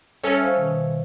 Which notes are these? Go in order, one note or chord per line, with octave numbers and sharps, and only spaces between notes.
G3 C#4 A4 C#5 E5 F6
C5 F5
B2 D#3